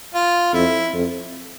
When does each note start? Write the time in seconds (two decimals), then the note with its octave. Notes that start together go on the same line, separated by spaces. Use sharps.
0.14 F4
0.53 F2 E4
0.94 F2